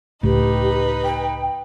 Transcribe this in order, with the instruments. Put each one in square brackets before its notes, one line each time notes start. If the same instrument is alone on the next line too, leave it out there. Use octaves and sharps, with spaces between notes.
[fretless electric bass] C#2 A2 [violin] D#4 B4 [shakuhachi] G4
[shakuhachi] G5